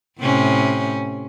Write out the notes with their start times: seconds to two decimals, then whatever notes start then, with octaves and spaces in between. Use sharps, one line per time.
0.20 A2 C3 C#4